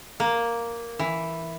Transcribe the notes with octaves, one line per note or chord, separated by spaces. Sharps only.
A#3
E3